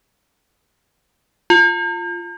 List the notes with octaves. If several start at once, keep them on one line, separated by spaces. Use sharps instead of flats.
F4